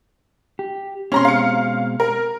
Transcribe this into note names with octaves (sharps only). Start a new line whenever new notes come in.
G4
B2 G#3 C4 C#4 A#5 C6
F5 C#7
A#4